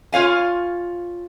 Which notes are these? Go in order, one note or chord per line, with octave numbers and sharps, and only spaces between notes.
F4 C#5 F5 G#5